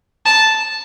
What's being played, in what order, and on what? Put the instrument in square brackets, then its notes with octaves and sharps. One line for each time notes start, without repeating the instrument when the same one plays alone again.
[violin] A5